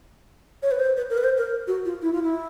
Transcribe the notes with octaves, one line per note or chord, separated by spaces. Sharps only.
C#5
B4
C5
B4
A#4
B4
C5
A#4
F#4
F4
E4
F4
E4